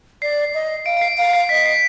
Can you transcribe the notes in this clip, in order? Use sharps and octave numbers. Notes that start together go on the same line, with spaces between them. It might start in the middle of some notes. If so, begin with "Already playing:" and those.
D5 C7
D#5
F5 D7
D7
C7
F5 D7
C7
D#5 B6
C7